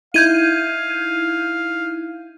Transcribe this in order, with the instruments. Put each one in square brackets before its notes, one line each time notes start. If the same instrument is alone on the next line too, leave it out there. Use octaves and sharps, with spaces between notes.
[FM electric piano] D#4 E4 [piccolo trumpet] F5 [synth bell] G6 G#6 D#7